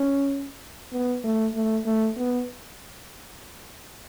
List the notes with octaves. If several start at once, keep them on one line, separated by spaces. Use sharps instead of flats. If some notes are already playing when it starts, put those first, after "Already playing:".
Already playing: C#4
B3
A3
A3
A3
B3